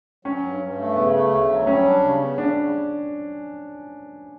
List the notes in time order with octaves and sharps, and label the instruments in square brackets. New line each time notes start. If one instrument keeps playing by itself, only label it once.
[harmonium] F#3 [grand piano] C#4
[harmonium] G2
G2
A3
[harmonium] C#3 [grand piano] B3
[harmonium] A3
D2
F#3
[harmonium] G3 [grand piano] C#4
[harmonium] D4
C#3
B3
[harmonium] G3 [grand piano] D4
[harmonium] C#3